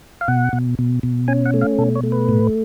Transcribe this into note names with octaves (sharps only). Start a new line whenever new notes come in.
F5
B2 F#5
B2
B2
B2
C#4 G#5
F#5
A3
F5
B2 A4
C#5
A3
B4
A2